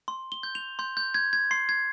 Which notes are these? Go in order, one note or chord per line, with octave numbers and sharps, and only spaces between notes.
C6
G7
G6
F7
C6 G6
G6
G6 G#6
G#6
C6 C7
G#6